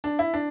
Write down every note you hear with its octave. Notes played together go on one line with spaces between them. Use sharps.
D4
E4
D4